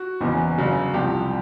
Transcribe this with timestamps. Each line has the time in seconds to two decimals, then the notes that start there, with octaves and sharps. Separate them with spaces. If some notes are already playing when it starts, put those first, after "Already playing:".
Already playing: F#4
0.21 F#1 E2 C#3 E3
0.58 G1 F#2 C#3 F#3
0.94 C2 C3 F3 G4